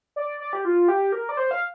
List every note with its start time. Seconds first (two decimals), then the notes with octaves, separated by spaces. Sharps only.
0.16 D5
0.40 D5
0.53 G4
0.65 F4
0.88 G4
1.12 A#4
1.29 D5
1.37 C5
1.51 F5